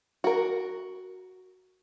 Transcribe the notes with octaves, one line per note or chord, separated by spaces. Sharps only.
F#4 A#4